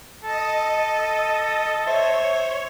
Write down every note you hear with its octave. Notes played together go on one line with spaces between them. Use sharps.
A4 D#5
C5 C#5 E5